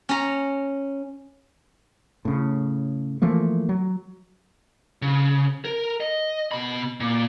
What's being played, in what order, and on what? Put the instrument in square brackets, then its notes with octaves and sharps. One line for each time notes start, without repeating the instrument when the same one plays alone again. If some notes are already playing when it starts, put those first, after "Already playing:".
[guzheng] C#4 A#5
[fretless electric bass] A2 C#3
E3 F3 A3 A#3
F#3
[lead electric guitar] C#3
A#4
D#5
B2 B5
A#2